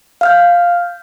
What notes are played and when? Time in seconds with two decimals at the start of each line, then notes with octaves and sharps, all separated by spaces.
0.21 F5 F6 G6